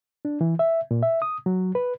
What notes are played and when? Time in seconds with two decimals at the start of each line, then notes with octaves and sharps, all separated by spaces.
0.25 D4
0.41 E3
0.59 E5
0.91 A#2
1.03 E5
1.22 D#6
1.46 F#3
1.75 B4